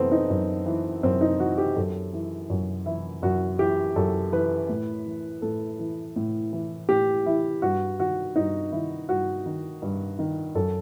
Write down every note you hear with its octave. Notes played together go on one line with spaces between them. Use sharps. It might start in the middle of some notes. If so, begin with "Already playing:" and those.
Already playing: F#2 E3 A3 B3 C4
D#4
F#2
E3
F#2 C4
D#4
E3 F#4
G4
F#2 A4
E3
F#2
E3 E4
F#2 F#4
E3 G4
F#2 A4
E3 B4
A2
E3
A2 A4
E3
A2
E3
A2 G4
E3 E4
G2 F#4
D#3 F#4
G2 D#4
D#3 E4
G2 F#4
D#3
G2
D#3
F#2 A4